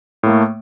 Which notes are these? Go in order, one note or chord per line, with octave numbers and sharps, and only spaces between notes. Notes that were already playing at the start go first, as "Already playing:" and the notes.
A2 A3 A#3